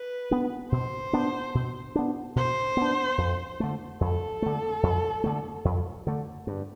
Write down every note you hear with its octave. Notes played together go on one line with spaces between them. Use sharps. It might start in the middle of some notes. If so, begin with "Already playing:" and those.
Already playing: B4
B3 D4
B2 C5
B3 D4
B2
B3 D4
B2 C5
B3 D4
F2
D3 A3
F2 A4
D3 A3
F2
D3 A3
F2
D3 A3
G2